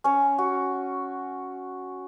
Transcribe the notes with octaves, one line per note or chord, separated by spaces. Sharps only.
C#4 C#5
F#4